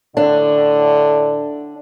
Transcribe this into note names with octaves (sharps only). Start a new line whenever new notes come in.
A2 D3 D4